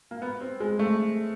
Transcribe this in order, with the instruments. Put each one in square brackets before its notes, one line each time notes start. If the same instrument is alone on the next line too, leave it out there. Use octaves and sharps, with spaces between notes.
[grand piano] A#3
B3
C4
G#3
A3